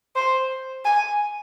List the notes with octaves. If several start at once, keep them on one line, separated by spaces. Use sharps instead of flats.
C5
G#5